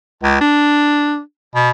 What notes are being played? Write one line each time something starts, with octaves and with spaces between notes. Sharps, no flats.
C#2
D4
B2